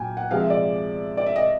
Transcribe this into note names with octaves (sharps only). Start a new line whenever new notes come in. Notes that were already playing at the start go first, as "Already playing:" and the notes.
Already playing: A#2 F#3 G5 G#5
F#5
C3 F3 G#3 F5
E5
D5
D5
E5
D#5